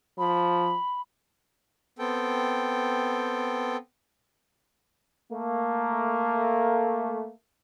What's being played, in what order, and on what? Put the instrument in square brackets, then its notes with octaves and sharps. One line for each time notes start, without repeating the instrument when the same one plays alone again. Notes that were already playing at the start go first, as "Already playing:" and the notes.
[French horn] F3 [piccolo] B5
[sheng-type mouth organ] B3 C4 A4 G5
[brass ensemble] A3 A#3